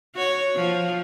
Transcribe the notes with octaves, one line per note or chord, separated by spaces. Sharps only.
F#4 C#5
F3